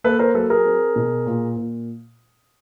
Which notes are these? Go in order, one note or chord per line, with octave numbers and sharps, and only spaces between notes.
A#3 A4 B4
A#4 C5
F#3 A4 B4
G#4 A#4
C4
B2
A#2
A#2